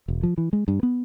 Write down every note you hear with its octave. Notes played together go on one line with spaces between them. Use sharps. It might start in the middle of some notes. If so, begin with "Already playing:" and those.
E1
F3
E3
G#3
G2
B3